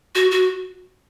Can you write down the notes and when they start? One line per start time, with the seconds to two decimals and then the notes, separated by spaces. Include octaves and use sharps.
0.15 F#4
0.31 F#4